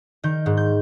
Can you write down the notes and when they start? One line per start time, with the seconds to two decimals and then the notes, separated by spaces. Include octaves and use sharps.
0.24 D#3 G6
0.46 G#2
0.57 G6